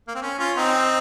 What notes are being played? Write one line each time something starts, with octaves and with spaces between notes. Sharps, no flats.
A#3
C4
C#4
C#4 F4
C4 D#4